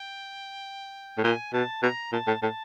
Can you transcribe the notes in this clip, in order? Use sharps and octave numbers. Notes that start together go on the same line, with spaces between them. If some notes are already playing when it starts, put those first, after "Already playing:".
Already playing: G5
A2
A#2 G#5
B2 A5
B2 A#5
A#2 A5
A2
A2 A5